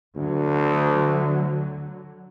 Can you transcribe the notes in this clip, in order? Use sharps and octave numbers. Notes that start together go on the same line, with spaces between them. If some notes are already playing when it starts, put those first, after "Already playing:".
D2 D3 F#3